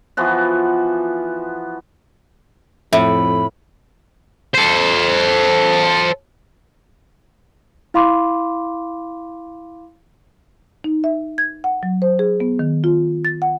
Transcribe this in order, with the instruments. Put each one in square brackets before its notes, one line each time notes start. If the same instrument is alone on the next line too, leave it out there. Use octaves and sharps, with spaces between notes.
[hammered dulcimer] E3 F3 B3 F#4
[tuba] F2 [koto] A2 [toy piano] E5 [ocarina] B5
[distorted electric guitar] A4 C5
[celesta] E4 F5 B5 C6 D6
[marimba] D#4
E5
G#6
F#5
F#3
C5
G#4
B3
D#3
F4
A6
F#5